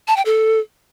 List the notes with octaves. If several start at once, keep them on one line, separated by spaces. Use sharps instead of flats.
A5
G5
A4